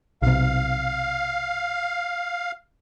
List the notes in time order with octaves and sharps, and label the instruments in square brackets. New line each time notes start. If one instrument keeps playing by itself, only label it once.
[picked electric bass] B1 C3 [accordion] F5